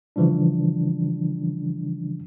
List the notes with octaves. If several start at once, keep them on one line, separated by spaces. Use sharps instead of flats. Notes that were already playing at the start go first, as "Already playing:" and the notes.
C#3 E3 F3 G3 D4